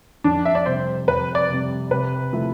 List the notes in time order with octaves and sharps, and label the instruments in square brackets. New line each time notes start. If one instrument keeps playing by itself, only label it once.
[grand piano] F2 [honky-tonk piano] D4
[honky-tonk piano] E5
D5
[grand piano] C3 G3 C4 [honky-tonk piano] C5
[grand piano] F2 [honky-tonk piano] B4
[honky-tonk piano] D5
[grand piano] C3 G3 C4
[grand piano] C3 [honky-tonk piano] B4
[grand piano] F3 A3 E4 A4